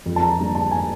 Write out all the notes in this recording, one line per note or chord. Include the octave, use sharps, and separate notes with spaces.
F2
A5
A#5
D3 G3 A#3 A#5
A5
G#5